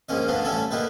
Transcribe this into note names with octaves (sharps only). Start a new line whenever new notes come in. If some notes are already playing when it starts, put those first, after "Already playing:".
A#1 G#2 A#3 C#4 D#5
D2 C#3 B3 C#4 D4
A1 G3 A3 C#4 A4 G#5
D3 A#3 D#4 G4 B4